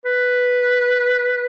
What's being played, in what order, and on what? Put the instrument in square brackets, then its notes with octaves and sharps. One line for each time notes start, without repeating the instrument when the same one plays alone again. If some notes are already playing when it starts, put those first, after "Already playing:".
[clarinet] B4